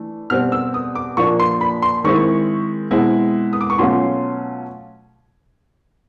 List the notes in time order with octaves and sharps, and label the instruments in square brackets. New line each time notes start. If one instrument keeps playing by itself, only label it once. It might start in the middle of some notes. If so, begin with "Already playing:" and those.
Already playing: [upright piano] E3 A3 D4
B2 G3 C4 F6
E6
D#6
D6
A#2 F3 A#3 D4 C#6
C6
B5
C6
D#3 G#3 C4 E4 C#6
B2 G#3 C4 E4
D#6
D6
C#6
B2 F#3 A3 C#4 F4 C6